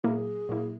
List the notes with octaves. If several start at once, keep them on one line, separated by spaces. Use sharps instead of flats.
A#2 F#3 A#3 E4 G#4 A#4
A#2 F#3 A#3 E4